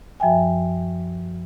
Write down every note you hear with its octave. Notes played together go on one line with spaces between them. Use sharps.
F#2 F3 E5 G5 G#5